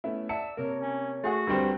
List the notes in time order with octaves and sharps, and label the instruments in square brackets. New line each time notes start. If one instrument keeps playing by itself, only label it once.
[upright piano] A3 B3 C#4 [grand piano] E4
[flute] D5 [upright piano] E5 F#5 C#7 [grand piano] A5 [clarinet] E6
[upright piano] C3 A#3 [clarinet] A#4 [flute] C#5
[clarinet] C#4
[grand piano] A3 G#4 F#5 [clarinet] F#4
[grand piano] D2 G3 C4 [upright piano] A#4 G5 [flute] B4